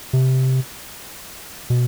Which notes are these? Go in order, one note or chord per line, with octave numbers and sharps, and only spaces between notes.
C3
B2